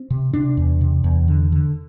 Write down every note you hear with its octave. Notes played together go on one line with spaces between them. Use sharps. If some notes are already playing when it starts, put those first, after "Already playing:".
Already playing: C4
C3
C3 D4
E2
C3
E2
D3
D3